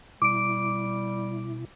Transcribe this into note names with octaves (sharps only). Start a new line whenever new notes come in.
B2 G3 E4 D6 D7